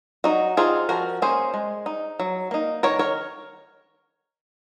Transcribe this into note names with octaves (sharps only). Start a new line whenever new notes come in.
F#3 D#4 F#4
C4 D#4 F4 G#4
F3 F#4 A#4
A#3 C#4 G#4 C5
G#3
D#4
F#3
A#3 D#4
D#3 A#4 C#5
A#4 C#5